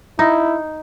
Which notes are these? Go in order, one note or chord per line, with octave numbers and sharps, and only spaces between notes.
D#4 E4